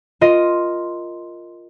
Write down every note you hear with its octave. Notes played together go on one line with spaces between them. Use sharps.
F4 A#4 D#5 C6